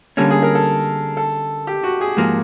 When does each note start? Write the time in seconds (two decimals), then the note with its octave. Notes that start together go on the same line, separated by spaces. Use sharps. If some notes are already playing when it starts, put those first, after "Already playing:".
0.17 D3 G3 A#3 C#4 A4
0.30 G#4
0.42 A#4
0.55 A4
1.17 A4
1.67 G4
1.83 F#4
2.01 G#4
2.17 G#2 F3 A#3